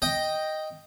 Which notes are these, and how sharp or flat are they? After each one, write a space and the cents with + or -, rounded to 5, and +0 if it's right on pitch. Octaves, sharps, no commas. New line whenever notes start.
D#5 +0 G5 +0 D#6 +0